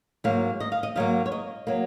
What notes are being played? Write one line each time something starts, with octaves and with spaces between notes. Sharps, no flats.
G#2 F#3 A#3 F5
D#5
F5
D#5
G#2 F#3 A#3 F5
C#5
D#5
F#3 A#3